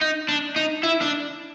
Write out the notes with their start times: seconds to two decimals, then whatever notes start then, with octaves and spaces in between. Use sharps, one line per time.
0.02 D#4
0.29 D4
0.56 D#4
0.83 E4
1.01 D4